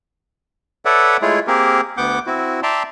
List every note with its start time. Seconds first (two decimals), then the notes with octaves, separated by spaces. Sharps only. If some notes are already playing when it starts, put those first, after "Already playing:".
0.85 A4 B4 C#5 D5 E5 F#5
1.22 G#3 A3 E4 F4 G#4 C#5
1.47 A#3 C4 G4 G#4 A#4
1.97 D2 B3 F#5 D6 G6
2.26 C4 E4 F#4
2.63 D5 E5 G5 A5 A#5 C6